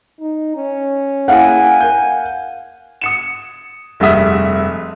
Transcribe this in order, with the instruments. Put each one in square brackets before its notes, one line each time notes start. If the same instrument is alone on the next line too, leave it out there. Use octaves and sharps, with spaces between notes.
[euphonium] D#4
C#4
[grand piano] A#3 E4 G#4 [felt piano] F5 F#5 [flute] G#5
[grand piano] A#4 G6
[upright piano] D#6 C#7 E7
F1 G2 G#3 E5 D#6 B6